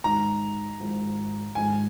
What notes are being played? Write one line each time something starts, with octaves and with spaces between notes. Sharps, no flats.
G#2 D#3 G#3 D#4 F#4 A#5
G#1 G#2 F3 G#3
G#1 G#2 F3 G#3 G#5